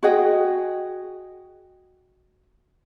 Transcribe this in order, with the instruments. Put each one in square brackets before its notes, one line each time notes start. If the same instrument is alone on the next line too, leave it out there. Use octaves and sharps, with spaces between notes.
[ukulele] F#4 G#4 D#5 G5